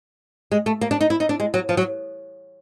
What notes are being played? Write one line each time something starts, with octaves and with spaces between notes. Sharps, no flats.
G#3
A3
A#3
D4
D#4
E4
D#4
D4
G#3
F#3
F3
F#3